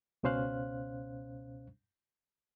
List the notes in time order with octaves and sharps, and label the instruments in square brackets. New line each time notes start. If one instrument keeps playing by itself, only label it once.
[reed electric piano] C#2 B2 C#4 C5 F5 F#6